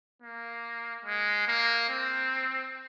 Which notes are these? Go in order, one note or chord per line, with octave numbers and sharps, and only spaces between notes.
A#3
G#3
A#3
C4